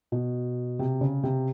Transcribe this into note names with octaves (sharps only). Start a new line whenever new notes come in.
B2
C3
C#3
C3